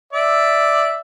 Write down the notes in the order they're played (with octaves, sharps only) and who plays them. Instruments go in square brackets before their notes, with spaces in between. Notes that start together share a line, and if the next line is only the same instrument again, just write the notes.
[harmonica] D5 E5